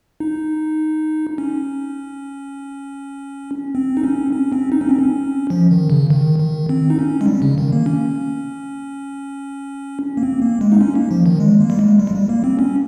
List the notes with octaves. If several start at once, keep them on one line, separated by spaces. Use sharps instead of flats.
D#4
C#4
C4
D#4
C#4
C#4
C4
D#4
C#4
C4
C#4
F3
D#3
C#3
D#3
D#3
C4
D#4
C#4
G#3
G3
C#3
D#3
A#3
C#4
A#3
C4
A#3
G#3
D#4
C#4
A#3
F3
D#3
G#3
A#3
G3
G#3
G3
G#3
G3
A#3
C4
C#4